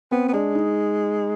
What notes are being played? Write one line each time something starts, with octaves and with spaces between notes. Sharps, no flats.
B3 C4
B3
G#3 D4
D#4